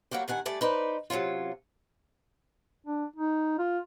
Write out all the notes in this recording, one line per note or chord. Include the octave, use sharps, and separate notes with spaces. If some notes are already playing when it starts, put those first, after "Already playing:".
F#3 G3 A#3 F#4 G4
G2 D#3 F#5 G#5
G3 A3 D5 G#5
D#4 B4 C5 D5
C3 F#3 G3 C#4 F4
D4
D#4
F4